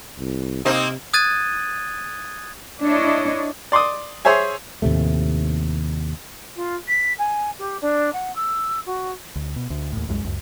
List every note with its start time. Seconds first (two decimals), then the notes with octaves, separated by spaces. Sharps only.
0.19 C2
0.65 C3 A#3 C4 D#4
1.14 D#6 F#6 G#6 A6 D#7
2.81 D4 E4 C#5 D#5
3.72 D5 C6 D6 D#6
4.25 G#4 C5 C#5 E5 G#5
4.82 D#2 A2 C3 A3
6.56 F4
6.87 B6
7.18 G#5
7.59 G4
7.81 D4
8.13 F#5
8.36 E6
8.86 F#4
9.36 D2
9.56 B2
9.70 D2
9.92 D#2 A2
10.08 C2 F#2 G#3
10.24 C#2 F#2